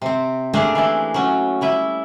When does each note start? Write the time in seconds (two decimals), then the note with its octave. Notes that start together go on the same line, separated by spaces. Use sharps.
0.02 C3 C4
0.53 A3 A#3 D4 G4 G#4 C5
0.75 E3 E4
1.14 F#3 C#4
1.61 G3 E4 E5